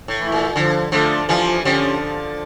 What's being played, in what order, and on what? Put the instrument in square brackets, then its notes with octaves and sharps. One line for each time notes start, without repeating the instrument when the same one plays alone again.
[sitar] A2
[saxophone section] E3 A3 E4
[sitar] A#2
[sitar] D3 [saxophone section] F3
[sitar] D3 F3 [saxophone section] A3 D4 F4 A4
[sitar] E3 G3 [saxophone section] F3
[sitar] D3 F3 [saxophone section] C#4 G4